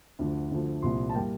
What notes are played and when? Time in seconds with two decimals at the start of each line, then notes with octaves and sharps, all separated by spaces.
0.19 D2 D3 F3
0.51 D2 D3 F3 A3
0.82 C2 A#2 F3 C6
1.09 A5
1.15 A#2 G3 A#3 G5